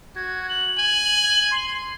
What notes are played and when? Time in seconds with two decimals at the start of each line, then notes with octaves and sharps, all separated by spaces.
0.16 F#4 G#6
0.49 F#7
0.78 G#5
1.51 C6